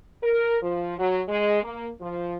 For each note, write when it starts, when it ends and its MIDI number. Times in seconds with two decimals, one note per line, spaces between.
0.22 0.57 70
0.62 0.96 53
0.98 1.20 54
1.28 1.60 56
1.62 1.89 58
2.01 2.36 53